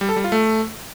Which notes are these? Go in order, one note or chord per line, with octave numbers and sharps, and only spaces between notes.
G3
A4
G3
F4
A3